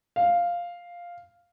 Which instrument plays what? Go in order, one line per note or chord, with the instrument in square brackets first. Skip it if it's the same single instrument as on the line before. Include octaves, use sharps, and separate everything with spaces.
[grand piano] F5